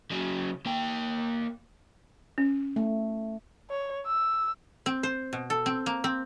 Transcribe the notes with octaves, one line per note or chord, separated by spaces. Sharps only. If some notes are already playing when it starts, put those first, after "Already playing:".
C#3 F#3
A#3 G5
C#4
A3
C#5
E6
C4
C5
B2
A4
C4
A#3
C4